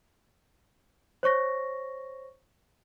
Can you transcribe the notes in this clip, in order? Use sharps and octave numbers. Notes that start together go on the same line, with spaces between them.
C5 C#5 C#6 A#6